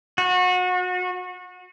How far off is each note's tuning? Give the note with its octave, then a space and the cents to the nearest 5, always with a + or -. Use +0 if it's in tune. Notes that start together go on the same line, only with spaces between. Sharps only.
F#4 -30